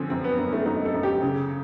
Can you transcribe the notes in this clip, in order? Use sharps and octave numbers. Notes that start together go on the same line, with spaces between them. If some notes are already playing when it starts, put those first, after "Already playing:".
Already playing: D3 F3 C4 C#4
F#2 C4
B3
F#2 A#3
A3
F#2 D#4
A4
F#2
G4
C#3